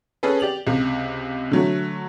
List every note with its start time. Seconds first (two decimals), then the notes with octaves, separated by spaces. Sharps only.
0.23 C#4 G#4 A4 B4
0.40 G4 D5 F7 F#7
0.67 C#2 C3
1.51 D3 F#3 A3